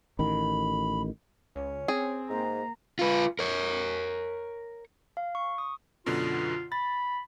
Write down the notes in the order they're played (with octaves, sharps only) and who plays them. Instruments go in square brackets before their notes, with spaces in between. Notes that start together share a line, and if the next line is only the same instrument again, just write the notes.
[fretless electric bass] A1 D#3 [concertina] B5
[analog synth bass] C#2 [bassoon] C#4
[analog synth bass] C4 [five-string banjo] G#4
[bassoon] G#2 [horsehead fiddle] A#3 A#5
[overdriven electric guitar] F4 B4
A#4 C#5
[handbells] F5
C#6
D#6
[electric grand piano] F#2 B2 D3 [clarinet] F4
[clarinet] B5 [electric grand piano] A6